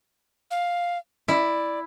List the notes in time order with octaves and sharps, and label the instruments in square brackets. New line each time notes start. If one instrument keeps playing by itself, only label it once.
[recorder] F5
[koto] E4 [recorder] D5